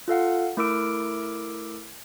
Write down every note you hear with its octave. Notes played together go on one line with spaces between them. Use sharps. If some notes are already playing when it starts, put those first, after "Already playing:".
F4 A4 F5 F#5
A3 E4 A#4 D6 E6 D7